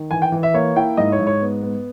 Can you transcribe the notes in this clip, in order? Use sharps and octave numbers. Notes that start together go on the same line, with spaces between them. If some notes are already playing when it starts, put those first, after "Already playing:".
Already playing: D#3
E3 G#5
G5
E3
E5
A#3 C#5
E4 G5
G#2 D#5
C#5
G#2
C#5
B3
B3